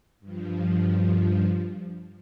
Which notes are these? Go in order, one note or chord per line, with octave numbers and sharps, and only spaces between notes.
G2 F3